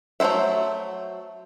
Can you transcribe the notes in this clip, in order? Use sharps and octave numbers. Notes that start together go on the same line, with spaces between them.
F#3 A3 E4 C5 E5